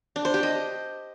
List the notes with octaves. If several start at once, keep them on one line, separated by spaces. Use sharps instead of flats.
D4
C5
G4
D#5